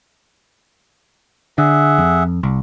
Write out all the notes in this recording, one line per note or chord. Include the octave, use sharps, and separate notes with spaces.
D3 G#4 E5 F#5
F2
C2